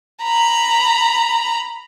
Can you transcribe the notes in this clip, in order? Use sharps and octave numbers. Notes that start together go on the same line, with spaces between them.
A#5 B5